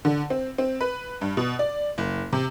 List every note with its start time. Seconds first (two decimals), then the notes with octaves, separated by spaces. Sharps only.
0.05 D3
0.30 C4
0.58 C4
0.81 B4
1.21 G2
1.37 B2
1.59 D5
1.98 F#1
2.33 C3